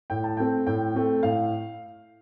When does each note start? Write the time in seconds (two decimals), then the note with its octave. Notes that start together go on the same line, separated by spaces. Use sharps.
0.10 A2 G5
0.24 A5
0.37 A3 C4 G5
0.67 A2 G5
0.95 A3 C4
1.23 A2 F5